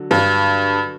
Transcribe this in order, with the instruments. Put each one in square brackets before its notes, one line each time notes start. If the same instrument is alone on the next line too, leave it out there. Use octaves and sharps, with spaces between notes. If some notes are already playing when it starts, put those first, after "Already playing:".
Already playing: [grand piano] D3 F#3
[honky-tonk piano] G2